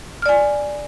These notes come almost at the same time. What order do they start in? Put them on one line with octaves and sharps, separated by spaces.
F6 D5 G#5